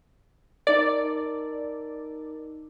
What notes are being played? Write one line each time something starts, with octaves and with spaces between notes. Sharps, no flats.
D#4 A#4 D5